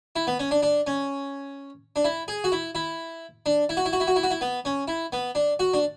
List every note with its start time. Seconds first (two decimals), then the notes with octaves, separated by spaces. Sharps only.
0.16 E4
0.27 B3
0.40 C#4
0.51 D4
0.63 D4
0.87 C#4
1.96 D4
2.04 E4
2.28 G#4
2.44 F#4
2.52 E4
2.75 E4
3.46 D4
3.69 E4
3.77 F#4
3.85 E4
3.93 F#4
4.00 E4
4.07 F#4
4.16 E4
4.23 F#4
4.31 E4
4.41 B3
4.65 C#4
4.88 E4
5.13 B3
5.35 D4
5.59 F#4
5.74 D4